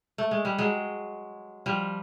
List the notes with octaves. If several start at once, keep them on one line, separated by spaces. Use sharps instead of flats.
A3
G#3
G3
F#3 G#3
F3 G3